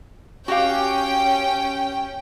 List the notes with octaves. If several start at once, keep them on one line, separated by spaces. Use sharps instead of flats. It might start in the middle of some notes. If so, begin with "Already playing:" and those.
C#4 F#4 G4 F5 G5